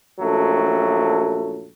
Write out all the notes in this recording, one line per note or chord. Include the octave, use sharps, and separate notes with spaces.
A#1 F#2 F#3 A3 A4